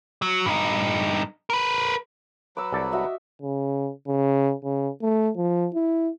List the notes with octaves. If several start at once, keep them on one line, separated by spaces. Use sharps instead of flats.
F#3
G2 D#4
A#4 B4
F#3 B4 D6 E6
C2 A4 D5
F#4 D#5 E5
C#3
C#3
C#3
A3
F3
E4